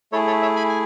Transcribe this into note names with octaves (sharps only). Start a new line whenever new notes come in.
A3 E4 G#4 A4 C#5
A4 C#5
C#5 E5
G#5 B5
G#5